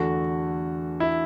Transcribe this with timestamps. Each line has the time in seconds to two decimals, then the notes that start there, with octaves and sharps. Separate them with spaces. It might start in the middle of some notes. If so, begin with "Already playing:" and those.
Already playing: E2 D3 A3 F#4
1.00 E4